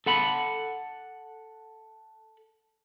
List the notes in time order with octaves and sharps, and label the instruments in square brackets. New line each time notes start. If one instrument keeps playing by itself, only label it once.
[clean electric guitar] A4 F#5 B5